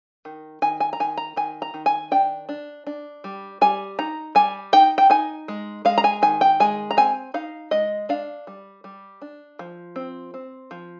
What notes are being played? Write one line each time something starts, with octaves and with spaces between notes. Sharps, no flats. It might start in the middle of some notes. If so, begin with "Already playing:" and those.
D#3
D#3 G#5
G#5
A#5
D#3 G#5
A#5
D#3 G#5
A#5
D#3
G#5
D4 G5
D4
D4
G3
G3 G#5
D#4 A#5
G3 G#5
D#4 G5
G5
D#4 G#5
G#3
G#3 F5
A#5
G#5
D#3 G#5
G5
G#3 G#5
A#5
C4 G#5
D#4 F5
G#3 D#5
D4 F5
G3
G3
D4
F3
C4
C4
F3